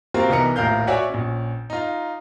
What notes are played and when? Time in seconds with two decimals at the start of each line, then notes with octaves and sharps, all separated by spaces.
0.14 G3 A#3 C4 F4 F#4 A#4
0.29 C2 E3 B3 D#4 A#4 C#7
0.56 D#1 A#1 A2 A#4 F5 G6
0.87 F#4 C#5 D5 E5 F#5 G#5
1.10 A#1 C#4
1.70 D#4 F4